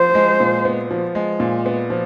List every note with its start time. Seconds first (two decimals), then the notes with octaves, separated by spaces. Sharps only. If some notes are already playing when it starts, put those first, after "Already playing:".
Already playing: F3 C5
0.15 G#3
0.40 A#2
0.65 B3
0.91 F3
1.15 G#3
1.40 A#2
1.66 B3
1.90 F3